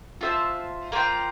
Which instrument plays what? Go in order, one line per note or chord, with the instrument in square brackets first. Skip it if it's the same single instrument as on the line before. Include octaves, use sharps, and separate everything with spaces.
[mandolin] F4 C5 E5 A5
A#3 F4 C5 G5